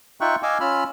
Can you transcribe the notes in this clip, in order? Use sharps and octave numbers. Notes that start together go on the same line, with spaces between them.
D#4 F4 E5 G5 C#6 F#6
D#5 F5 G#5 D6 E6
C#4 F4 B5 E6 F6